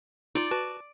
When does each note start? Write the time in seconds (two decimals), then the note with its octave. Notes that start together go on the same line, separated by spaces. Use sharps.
0.35 D#4 F4 D5
0.51 F#4 B4 A5